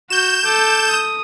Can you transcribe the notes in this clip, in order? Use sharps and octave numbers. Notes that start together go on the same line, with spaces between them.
F#4 G6 E7
A4 D6
D#6